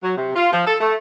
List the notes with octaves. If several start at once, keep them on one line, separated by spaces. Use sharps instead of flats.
F#3
C3
F4
F3
A4
A3